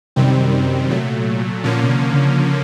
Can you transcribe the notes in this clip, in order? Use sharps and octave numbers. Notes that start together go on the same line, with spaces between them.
F#2 C3 D#3 G3 C4
A#2 F#3 A3
A#2 D3 F3 A#3 C#4
B2
C3
C#3